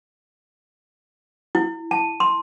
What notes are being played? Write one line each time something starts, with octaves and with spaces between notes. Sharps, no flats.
E4
A5
C6